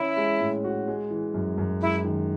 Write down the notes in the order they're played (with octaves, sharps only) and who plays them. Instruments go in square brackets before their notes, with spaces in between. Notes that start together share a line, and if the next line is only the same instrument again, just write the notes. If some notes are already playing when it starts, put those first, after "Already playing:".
Already playing: [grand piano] E3 C#4 [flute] E4
[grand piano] G#3
A2
F#4
G#3
E3
F#2
F#2
[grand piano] G#3 [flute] E4
[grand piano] D#3